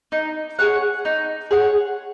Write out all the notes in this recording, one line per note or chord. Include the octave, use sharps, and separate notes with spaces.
D#4
G#4 C#5 F#5
D#4
G#4 C#5 F#5